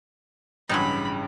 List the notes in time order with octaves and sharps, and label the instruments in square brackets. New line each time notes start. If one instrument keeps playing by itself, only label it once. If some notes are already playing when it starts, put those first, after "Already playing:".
[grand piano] A1 G2 C#3 [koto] F#3 G#3 D#4 [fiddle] B5